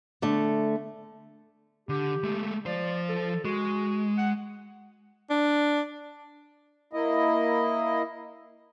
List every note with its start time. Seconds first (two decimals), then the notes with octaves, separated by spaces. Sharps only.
0.22 D3 A3
1.89 D3 G4
2.24 G#3 A3
2.66 F3 C5 D5
3.09 A4
3.45 G#3 F#4
4.18 F#5
5.30 D4
6.93 A#3 E4 D#5